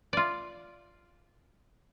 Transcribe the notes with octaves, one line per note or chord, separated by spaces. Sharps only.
F4 D5